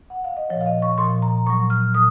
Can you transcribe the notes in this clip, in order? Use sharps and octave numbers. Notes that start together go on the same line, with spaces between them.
F#5
F5
D#5
A#2 F3 C#5
F5
D#5
C#6
A#2 F3 C6
A#5
A#2 F#3 C#6
F6
A#2 D#6